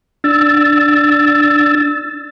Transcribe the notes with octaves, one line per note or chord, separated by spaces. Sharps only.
D4 E6 A6